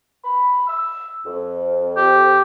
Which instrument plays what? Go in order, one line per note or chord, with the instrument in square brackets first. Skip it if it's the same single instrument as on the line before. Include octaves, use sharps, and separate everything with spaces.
[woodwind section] B5
E6
F2
[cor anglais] G4